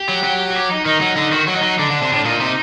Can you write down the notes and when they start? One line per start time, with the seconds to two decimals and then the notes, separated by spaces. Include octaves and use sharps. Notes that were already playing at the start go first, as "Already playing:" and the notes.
Already playing: G4
0.09 F#3
0.24 F#3
0.50 F#4
0.55 G4
0.70 D#4
0.86 D#3 D#4
1.01 F#3
1.16 D3
1.32 D#3 F#4
1.48 F#3
1.55 D#4
1.63 F#3
1.78 D3 D4
1.90 D3
2.02 C3
2.13 A2
2.25 A#2 D#4
2.41 C3